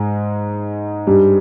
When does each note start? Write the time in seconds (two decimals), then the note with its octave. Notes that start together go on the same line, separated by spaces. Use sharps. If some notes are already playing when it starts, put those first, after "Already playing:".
Already playing: G#2 G#3
1.07 G2 G3